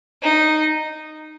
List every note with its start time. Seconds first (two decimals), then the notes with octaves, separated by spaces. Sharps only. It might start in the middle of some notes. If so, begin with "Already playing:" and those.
0.23 D#4